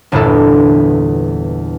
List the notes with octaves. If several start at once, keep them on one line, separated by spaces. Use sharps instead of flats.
G1 E2 A#2 D4 E4 A4